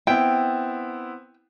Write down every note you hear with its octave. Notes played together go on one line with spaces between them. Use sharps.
B3 C4 E4 G5